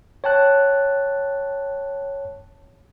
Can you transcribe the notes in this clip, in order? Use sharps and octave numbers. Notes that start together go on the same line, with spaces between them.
C#5 G5 A5 F#6